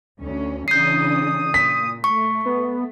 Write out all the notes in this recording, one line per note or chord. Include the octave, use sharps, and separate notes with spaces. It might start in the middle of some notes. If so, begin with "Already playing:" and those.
D2 C#4
C#3 E3 D4 D#6 G6 C7
A#2 B6
A3 C#6
B3